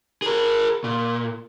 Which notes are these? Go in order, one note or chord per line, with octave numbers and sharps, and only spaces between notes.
G#4 A#4
A#2